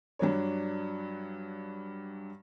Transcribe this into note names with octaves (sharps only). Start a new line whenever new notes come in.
G2 F#3 D4 C#5